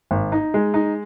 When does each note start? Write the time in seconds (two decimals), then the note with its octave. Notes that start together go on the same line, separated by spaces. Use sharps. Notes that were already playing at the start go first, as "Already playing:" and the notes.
0.11 G#1
0.32 D#4
0.54 G#3
0.74 D#4